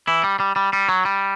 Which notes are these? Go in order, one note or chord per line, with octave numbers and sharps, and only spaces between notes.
E3 E4
G3
G3
G3
G3
F#3
G3